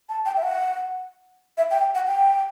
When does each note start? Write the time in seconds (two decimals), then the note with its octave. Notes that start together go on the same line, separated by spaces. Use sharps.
0.09 A5
0.25 G5
0.37 E5
0.43 F#5
1.57 E5
1.71 G5
1.95 F#5
2.07 G5